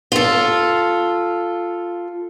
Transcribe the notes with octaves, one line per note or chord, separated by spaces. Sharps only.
F4 A4